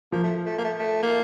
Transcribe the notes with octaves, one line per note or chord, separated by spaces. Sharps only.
F3 A#3
A3
A3
A#3
A3
A3
A#3